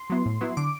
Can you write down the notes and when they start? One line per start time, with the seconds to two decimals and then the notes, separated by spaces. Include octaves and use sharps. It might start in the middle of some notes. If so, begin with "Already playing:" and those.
Already playing: C6
0.10 F#3 B3 E4
0.26 A2
0.41 F#3 B3 E4
0.57 D3 D6